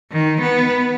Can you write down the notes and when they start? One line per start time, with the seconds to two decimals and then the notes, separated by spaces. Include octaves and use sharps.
0.12 D#3
0.41 B3